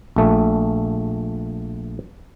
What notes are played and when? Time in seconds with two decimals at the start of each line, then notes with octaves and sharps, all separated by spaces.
0.16 A#1 A3